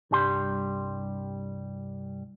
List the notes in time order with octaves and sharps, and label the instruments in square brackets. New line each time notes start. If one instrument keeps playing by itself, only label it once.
[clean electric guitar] C2 G2 G3 G4 C6